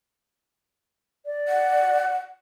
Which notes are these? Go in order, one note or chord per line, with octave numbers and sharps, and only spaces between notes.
D5
F#5